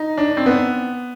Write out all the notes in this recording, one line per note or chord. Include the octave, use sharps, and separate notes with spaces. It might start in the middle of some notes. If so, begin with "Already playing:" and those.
Already playing: D#4
D4
C4
B3